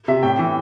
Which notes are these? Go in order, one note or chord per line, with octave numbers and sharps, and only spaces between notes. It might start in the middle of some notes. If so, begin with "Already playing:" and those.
C3 E5
A2 G5
E3